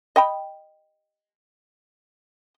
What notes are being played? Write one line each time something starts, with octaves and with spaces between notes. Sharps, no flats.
D#5 G5 B5